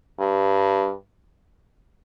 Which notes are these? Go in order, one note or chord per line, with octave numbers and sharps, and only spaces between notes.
G2